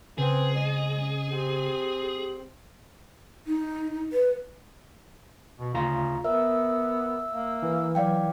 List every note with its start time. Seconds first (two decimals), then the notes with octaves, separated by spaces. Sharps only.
0.18 C#3 C4 G#4 B4
0.55 G#3 D#5
0.99 C#4
1.30 C4 G4
3.47 D#4
4.13 B4
5.59 B2
5.74 D2 C#3 F4 A#5
6.24 B3 A#4 E5 E6
7.33 A#3
7.62 E3
7.95 F#3 D5 F5 G5